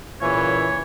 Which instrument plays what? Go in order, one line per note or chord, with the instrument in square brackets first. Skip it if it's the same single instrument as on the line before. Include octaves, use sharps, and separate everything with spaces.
[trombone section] A#2 C#3 E3 [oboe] C#5